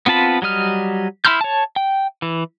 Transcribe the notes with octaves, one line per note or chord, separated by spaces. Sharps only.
B3 C4 F4 A5 B5
F#3 G3 D#5 F6
E4 B5 C6 F6 G6
C#5 A5
G5
E3